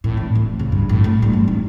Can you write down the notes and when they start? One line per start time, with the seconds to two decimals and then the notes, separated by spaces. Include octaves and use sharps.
0.04 A2
0.17 D3
0.35 D1
0.59 C#3
0.72 G2
0.89 A2
1.04 A3
1.22 G3
1.33 G1
1.48 D#4